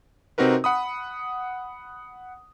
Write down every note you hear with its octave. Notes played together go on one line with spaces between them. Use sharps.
C3 C4 D#4 F#4 A#4 B4
F#5 B5 D#6